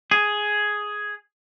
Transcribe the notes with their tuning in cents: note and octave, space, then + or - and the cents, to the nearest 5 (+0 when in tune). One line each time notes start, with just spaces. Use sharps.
G#4 +5